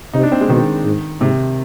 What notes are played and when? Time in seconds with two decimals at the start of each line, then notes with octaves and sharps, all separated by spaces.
0.13 C3 D#4
0.23 D4
0.32 C4
0.41 G#3
0.49 B2 D#3
0.84 G#2
1.20 G#2 C3